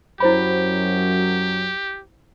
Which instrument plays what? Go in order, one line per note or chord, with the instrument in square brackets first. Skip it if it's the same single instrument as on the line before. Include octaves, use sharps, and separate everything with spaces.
[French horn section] F#2 F#3 [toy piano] E4 C5 B5 [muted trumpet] G4